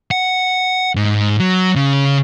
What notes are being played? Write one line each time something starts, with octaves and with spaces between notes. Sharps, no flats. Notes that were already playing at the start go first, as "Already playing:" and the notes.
F#5
G#2
F#3
C#3